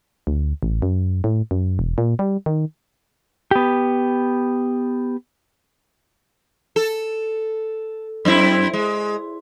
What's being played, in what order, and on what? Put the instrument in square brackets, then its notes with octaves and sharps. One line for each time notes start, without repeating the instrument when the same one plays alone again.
[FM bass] D2
A1
F#2
A2
F#2
E1
A#2
G3
D#3
[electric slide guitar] B3 G4
[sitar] A4
F#2 C4 E4
G#3